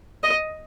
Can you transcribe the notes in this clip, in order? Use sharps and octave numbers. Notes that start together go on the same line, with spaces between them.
D#5